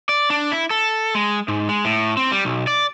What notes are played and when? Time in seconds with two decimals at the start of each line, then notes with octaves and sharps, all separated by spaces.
0.09 D5
0.30 D4
0.52 E4
0.70 A4
1.15 G#3
1.48 G#2
1.69 G#3
1.85 A2
2.17 C4
2.32 G3
2.45 B1
2.67 D5